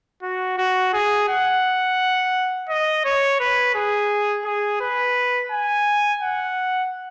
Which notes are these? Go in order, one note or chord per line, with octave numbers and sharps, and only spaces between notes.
F#4
F#4
G#4
F#5
D#5
C#5
B4
G#4
G#4
B4
G#5
F#5